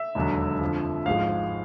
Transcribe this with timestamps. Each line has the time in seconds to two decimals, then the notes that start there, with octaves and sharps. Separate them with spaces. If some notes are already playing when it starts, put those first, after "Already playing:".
Already playing: E5
0.15 E1 D#2 D3 F#3
0.61 F2 D3 F3
1.06 G#1 G#2 F3 G#3 F5